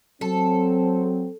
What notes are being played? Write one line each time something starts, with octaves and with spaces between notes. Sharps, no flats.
F#3 C4 A4